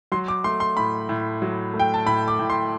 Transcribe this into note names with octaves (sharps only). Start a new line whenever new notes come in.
F#3 C6
D6
A3 C6
C6
A2 B5
A2
F#3
A3
G5
A5
A2 B5
D6
A2
C6